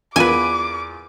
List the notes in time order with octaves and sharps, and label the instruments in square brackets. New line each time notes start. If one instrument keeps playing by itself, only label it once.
[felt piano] E2 F4 D#7 [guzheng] B4 G#5 [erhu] D6